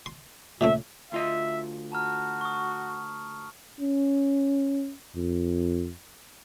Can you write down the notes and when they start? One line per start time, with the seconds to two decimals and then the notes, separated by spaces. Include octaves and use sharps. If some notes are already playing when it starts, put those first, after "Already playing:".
0.06 C6
0.61 A#2 C#3 A3 E5
1.12 D2 F4 D#5 E5
1.92 F#4 A5 A#5 F6
2.41 C#6 D#6
3.81 C#4
5.16 F2